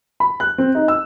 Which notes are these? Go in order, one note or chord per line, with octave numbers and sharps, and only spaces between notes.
B5
F#6
C4
D#4
E6